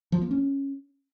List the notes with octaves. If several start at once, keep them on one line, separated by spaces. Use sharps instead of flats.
F3
A#3
C#4